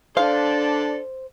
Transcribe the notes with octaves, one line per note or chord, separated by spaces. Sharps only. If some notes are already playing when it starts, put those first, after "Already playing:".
D4 A4 C5 D5 F5